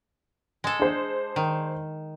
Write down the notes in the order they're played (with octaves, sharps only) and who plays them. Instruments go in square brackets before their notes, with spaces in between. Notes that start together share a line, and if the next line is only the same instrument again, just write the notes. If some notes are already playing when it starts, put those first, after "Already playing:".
[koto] G#3 A4
[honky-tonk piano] D4 G#4 C5
[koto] D#3